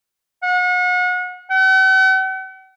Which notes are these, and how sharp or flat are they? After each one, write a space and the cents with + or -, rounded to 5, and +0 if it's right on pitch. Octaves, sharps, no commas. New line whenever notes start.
F#5 -35
F#5 +45